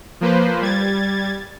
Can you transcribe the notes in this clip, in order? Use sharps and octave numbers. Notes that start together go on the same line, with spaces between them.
F3 A#3 B4 C5
G3 G#6 A6